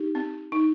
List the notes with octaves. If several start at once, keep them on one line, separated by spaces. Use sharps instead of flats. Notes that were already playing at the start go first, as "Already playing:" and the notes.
Already playing: D#4 G4
C4
D#4